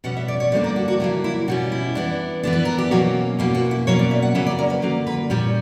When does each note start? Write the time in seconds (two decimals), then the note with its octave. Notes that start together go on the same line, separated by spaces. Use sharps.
0.04 B2 G3 C#4 F#5
0.17 E5
0.28 D5
0.40 C#5
0.52 D3 G3 A#3 D4 B4
0.64 A#4
0.76 F#4
0.88 F#4
1.00 C#3 F#3 A#3 E4
1.24 E4
1.48 B2 G3 C#4 F#4
1.72 E4
1.95 E3 B3 D4
2.43 E3 B3 D4
2.53 B4
2.65 A#4
2.78 G4
2.91 B2 F#3 A#3 C#4 F#4
3.38 B2 A#3 C#4 E4
3.55 F#4
3.71 E4
3.87 B2 F#3 A#3 C#4 C#5
3.99 D5
4.11 E5
4.22 F#5
4.34 C#3 F#3 A#3 C#4 E5
4.46 D5
4.59 A#4
4.70 B4
4.82 D3 F#3 A#3 A#4
5.07 B4
5.30 A#2 G3 C#4 G4